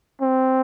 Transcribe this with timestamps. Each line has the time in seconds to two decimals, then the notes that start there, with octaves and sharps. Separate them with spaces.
0.21 C4